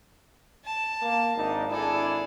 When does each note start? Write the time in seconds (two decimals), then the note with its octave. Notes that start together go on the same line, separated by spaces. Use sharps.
0.65 A5
1.02 A#3
1.36 G#1 D4 D#4
1.71 G#1 D4 E4 G#4 A4